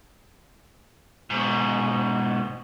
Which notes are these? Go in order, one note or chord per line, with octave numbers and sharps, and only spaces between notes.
G#2 B2